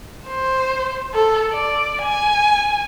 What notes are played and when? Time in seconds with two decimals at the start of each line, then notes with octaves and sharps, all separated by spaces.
0.28 C5
1.14 A4
1.53 D5
2.02 G#5